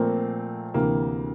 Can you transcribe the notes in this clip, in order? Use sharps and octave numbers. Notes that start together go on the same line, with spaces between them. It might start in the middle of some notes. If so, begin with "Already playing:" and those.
Already playing: A#2 F3 A3 A#3 C4
D2 C3 E3 A#3